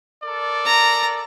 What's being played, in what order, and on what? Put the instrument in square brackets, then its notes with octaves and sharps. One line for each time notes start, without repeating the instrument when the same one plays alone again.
[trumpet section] A4 A#4 D5
[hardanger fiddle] A#5